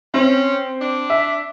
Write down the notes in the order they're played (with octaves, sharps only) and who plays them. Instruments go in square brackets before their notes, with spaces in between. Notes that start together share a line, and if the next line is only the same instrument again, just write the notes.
[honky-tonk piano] C4 [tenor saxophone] C#4
[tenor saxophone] D4
[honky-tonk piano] E5